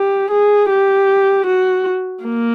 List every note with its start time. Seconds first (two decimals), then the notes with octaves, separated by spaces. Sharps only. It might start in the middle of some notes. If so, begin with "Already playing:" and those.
Already playing: G4
0.31 G#4
0.70 G4
1.47 F#4
2.24 A#3